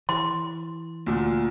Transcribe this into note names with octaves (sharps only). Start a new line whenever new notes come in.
E3 C6
D2 A#2